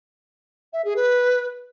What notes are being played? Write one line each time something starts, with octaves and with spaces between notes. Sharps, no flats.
E5
G#4
B4